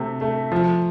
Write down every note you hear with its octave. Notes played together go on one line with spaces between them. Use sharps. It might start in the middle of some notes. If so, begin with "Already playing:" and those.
Already playing: C3 A3
A3
F3